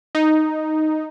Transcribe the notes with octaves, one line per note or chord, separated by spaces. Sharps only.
D#4